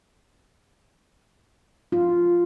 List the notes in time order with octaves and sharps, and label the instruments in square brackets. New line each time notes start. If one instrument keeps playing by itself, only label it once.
[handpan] F4